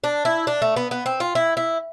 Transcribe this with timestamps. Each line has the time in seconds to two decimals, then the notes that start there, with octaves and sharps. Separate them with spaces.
0.04 D4
0.25 E4
0.47 D4
0.62 A3
0.76 B3
0.91 B3
1.06 C4
1.20 F4
1.35 E4
1.57 E4